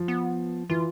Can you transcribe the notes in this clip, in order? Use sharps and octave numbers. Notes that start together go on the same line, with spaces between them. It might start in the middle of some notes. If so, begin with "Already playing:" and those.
Already playing: F3
B3
E3 F4